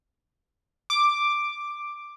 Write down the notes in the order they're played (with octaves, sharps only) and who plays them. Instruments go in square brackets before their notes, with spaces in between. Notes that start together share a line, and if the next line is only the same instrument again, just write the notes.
[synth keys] D6